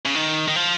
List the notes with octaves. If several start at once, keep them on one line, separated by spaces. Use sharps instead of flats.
C#3
D#3
D#3
F3